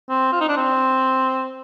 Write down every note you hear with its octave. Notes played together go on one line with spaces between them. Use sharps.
C4
F4
D#4
D4
C4